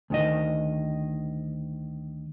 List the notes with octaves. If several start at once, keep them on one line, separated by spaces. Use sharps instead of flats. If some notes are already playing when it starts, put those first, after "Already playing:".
D2 D#3 D#5